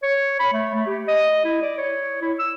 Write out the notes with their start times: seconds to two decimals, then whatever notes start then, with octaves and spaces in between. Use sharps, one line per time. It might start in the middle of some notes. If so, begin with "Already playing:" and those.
0.03 C#5
0.40 B5
0.53 A3
0.75 A3
0.87 G4
1.08 D#5
1.45 E4
1.62 D5
1.78 C#5
2.22 E4
2.39 E6